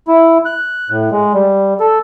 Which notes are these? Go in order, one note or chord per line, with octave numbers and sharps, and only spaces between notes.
E4
F#6
A2
G#3
G3
A4